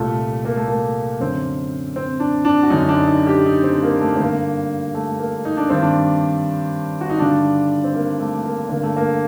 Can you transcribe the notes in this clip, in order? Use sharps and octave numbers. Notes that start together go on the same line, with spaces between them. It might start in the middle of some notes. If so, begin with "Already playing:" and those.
Already playing: C2 A#2 A3
A#3
A3
A#3
F#2 D3 C4
C4
D4
D4
F#4
F#2 D3 D#4
D4
D#4
G4
D#4
C4
A#3
A3
C4
G2 D3 A#3
A3
A#3
D#4
D4
G2 D#3 C4
D4
F#4
D#4
G2 D3 D4
C4
A#3
A3
A#3
G2 D3 A#3
A3
A#3